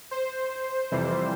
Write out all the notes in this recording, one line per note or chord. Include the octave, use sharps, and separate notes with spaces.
C5
F2 C3 E3 G3